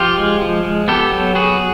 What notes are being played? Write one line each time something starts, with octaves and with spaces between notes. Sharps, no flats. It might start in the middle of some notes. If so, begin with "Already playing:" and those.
Already playing: F3 F4 G4
G#3
F3
G#3
B3 G4 A4
F#3
B3 F#4 G#4